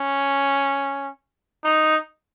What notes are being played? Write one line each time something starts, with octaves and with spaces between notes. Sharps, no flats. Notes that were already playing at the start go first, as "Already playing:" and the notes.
Already playing: C#4
D#4